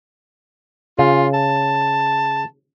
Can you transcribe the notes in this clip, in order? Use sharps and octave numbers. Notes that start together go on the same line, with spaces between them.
C#3 F4
A5